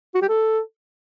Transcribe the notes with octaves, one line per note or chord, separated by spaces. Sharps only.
F#4
G4
A4